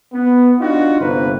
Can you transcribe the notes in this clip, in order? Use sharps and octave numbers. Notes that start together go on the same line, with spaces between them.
B3
D4 D#4 F4 F#4
G1 C3 A#3 B4